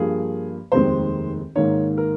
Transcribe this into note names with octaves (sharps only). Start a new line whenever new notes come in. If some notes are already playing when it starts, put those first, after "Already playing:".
Already playing: G2 F3 A#3 G#4
F1 D#2 D#3 G#3 C4 C5
G#2 D#3 A#3 D#4 C#5
A#4